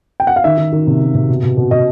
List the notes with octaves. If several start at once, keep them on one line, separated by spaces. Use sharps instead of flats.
G5
F#5
F5
D#3 E5
D#3
D#3
C3
D#3
C3
B2
B2
B2
B2 D#5